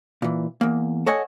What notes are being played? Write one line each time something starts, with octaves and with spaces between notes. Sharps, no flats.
A#2 E3
E2 A#3
A4 C#5 D#5 F#5 G#5